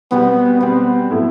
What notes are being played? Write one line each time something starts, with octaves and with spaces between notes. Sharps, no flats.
B2 G3 B3 C4
B2 G3 B3 C4
A2 F#3 A3 E4